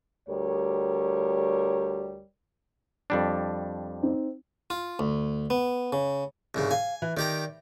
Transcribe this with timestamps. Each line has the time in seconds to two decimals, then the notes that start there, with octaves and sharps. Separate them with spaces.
0.28 D2 G3 G4 A#4 C#5
3.10 F2 G3 D4
4.03 C4 D#4
4.70 F4
4.99 D2
5.50 B3
5.93 C#3
6.55 C2 G#2 C#3
6.71 F5 G#5
7.02 E3
7.17 D#3 G4 D5 A#5